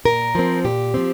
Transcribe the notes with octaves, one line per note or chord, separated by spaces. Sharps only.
A#2 A#4
F3 C4
A#2 G4
F3 C4